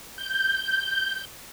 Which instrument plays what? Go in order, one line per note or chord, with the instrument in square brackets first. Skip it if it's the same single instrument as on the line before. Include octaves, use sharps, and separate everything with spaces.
[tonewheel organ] G6